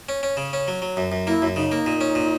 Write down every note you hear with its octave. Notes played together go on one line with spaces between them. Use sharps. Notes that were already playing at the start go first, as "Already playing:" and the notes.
C#4
C#4
C#3
C#4
F#3
F#3
F#2
F#2
A#3 E4
F#2
C#3 D#4
A#3
A#2
C#4
A#2